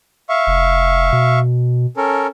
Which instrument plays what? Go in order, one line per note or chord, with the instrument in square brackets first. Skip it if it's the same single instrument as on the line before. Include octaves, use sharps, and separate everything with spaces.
[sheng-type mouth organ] E5 F5 C#6
[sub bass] F1
B2
[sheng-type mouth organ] C#4 A4 A#4